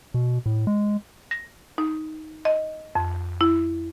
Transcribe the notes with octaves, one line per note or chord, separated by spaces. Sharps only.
B2
A2
G#3
A#6
D#4
D#5
F2
E4